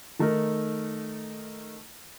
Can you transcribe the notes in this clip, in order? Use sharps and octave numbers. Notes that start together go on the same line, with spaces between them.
D#3 A3 D#4 A#4